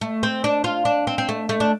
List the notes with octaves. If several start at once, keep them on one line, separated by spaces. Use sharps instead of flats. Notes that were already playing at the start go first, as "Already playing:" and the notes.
A3
C4
D4
F4
D4
C4
C4
A3
A3
D4